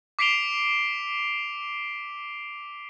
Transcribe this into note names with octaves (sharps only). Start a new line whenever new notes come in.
D6 B6 C7 D7 F7 G7